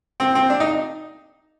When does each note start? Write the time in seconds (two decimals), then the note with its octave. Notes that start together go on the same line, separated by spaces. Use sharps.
0.20 C4
0.35 C4
0.50 D4
0.60 D#4